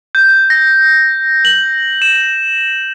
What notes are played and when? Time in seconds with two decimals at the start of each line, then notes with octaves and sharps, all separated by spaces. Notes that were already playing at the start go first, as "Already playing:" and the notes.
0.15 G6
0.50 A#6
1.45 F#7
2.02 E7